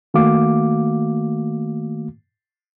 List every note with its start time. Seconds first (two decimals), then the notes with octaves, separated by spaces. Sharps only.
0.14 D#3 A3 A#3 F#4 F5 D6